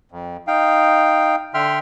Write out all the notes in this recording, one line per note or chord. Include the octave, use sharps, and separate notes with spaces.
F2
D#4 F5 G5
D3 E5 G5 C6 F6